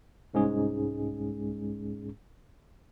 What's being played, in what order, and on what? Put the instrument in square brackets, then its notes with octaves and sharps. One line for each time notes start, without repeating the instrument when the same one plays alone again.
[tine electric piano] C2 G#2 G#3 C#4 G#4